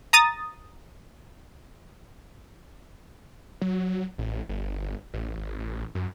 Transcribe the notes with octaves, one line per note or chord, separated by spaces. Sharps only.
A#5 D#6 A6
F#3
A1
G1
A1
G#1
A1
F#2